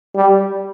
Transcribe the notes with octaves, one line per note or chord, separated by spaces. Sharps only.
G3